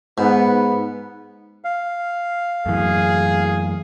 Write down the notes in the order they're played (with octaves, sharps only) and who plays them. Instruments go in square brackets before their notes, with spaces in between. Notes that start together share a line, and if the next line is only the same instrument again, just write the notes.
[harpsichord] G#2 [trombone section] B3
[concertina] F5
[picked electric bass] F#2 A2 E3 [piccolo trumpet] G#4